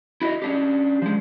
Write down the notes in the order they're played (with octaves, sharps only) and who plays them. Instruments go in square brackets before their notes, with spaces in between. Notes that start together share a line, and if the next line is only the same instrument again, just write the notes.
[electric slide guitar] E4 F#4 D5 D#5
C#4 D4 G4
F3 G#3